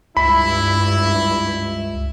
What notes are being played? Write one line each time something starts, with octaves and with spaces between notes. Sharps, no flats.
C#2 G2 E4 B5